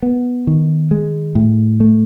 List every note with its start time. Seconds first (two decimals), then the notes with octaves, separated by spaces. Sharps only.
0.03 B3
0.47 D#3
0.91 G#3
1.35 A2
1.80 A3